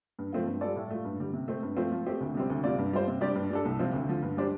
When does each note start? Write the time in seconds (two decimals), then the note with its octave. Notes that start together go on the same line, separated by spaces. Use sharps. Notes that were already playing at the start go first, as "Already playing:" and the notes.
0.19 G2
0.33 F3 A3 C4 F4
0.47 G2
0.61 G3 F4 A4 D5
0.76 A2
0.91 A3 F4
1.05 G2
1.19 D3 G3
1.34 C3
1.48 A3 C4
1.63 G2
1.77 F3 A3 C4 F4
1.92 F3
2.06 A3 C4 G4
2.21 D2
2.35 C3 G3 C4
2.50 D2
2.64 C3 G3 F4 D5
2.78 G2
2.93 G3 F4 C5
3.08 C3
3.21 G3 D4 G4 D5
3.35 G2
3.50 G3 D4 A4
3.65 C2
3.79 C3 F3 C4 F4
3.93 D2
4.09 D3 F3
4.22 G2
4.37 G3 D4 G4 C5